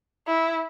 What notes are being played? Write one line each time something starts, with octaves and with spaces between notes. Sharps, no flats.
E4